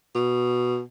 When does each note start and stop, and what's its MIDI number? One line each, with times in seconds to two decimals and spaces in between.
0.15 0.81 47